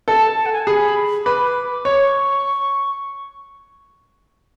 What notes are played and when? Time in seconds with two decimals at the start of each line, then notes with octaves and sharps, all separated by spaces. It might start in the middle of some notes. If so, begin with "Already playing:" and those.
0.08 A4 A5
0.46 F#5
0.53 G#5
0.60 A5
0.67 G#4 B5
1.25 B4 D6
1.85 C#5 C#6